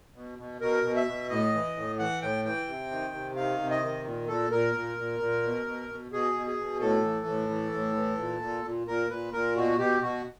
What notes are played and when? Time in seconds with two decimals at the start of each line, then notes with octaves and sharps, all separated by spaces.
0.15 B2
0.38 B2
0.61 B2 A#4
0.84 B2
0.96 E5
1.07 B2
1.30 A2 D#5
1.54 E3
1.77 A2
1.99 E3 F#5
2.22 A2 G5
2.45 E3 G5
2.68 C3
2.91 D#3
3.14 C3
3.36 D#3 F5
3.59 C3
3.70 D#5
3.82 D#3
4.05 A#2
4.28 A#2 A4
4.51 A#2 A#4
4.75 A#2
4.98 A#2
5.20 A#2
5.43 B2
5.66 B2
5.89 B2
6.12 B2 G#4
6.35 B2
6.47 G#4
6.58 B2
6.80 A2 A4
7.04 E3
7.27 A2
7.50 E3
7.73 A2
7.96 E3
8.18 A#2
8.42 A#2
8.65 A#2
8.87 A#2 A#4
9.10 A#2 B4
9.33 A#2 A#4
9.56 B2 F#4
9.79 B2 G4
10.02 B2 F#4